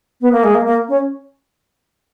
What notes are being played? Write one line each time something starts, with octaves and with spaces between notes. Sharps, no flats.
B3
A#3
G#3
A#3
A#3
C#4